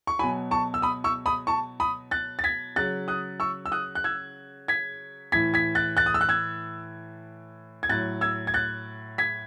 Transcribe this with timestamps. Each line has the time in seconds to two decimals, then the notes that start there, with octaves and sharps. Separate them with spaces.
0.07 C#6
0.19 B2 F#3 G#5 B5
0.51 A5 C#6
0.74 E6
0.82 B5 D#6
1.04 C#6 E6
1.26 B5 D#6
1.47 A5 C#6
1.80 B5 D#6
2.11 F#6 A6
2.39 A6
2.44 G#6 B6
2.76 C#3 F#3 F#6 A6
3.08 D#6 F#6
3.40 C#6 E6
3.66 E6
3.72 D#6 F#6
3.95 F#6
4.04 E6 G#6
4.68 G#6 B6
5.32 A2 E3 G#6 B6
5.54 G#6 B6
5.75 F#6 A6
5.97 F#6 A6
6.06 D#6
6.14 E6
6.21 F#6
6.29 E6 G#6
7.83 G#6
7.89 A2 F#3 F#6 A6
8.21 E6 G#6
8.47 G#6
8.54 F#6 A6
9.18 G#6 B6